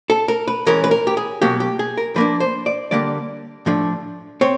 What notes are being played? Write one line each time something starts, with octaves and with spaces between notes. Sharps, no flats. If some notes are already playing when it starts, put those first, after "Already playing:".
A4
A#4
B4
E3 G#3 C#4 A#4
B4
A#4
G4
G#4
B2 F#3 A#3 G4
G4
G#4
A#4
F3 A#3 D4 B4
C5
D5
D3 G3 A#3 D5
A2 F3 A3 D4
C4 C#5